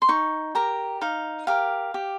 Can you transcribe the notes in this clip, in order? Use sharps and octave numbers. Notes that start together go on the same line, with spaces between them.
C6
D#4 C#6
G4 A#4 A#5
D#4 F5
G4 A#4 F5
G4